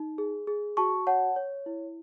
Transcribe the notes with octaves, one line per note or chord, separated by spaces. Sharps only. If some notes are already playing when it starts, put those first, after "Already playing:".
Already playing: D#4
G#4
G#4
F#4 A5 C#6
C#5 F#5 A5
C#5
E4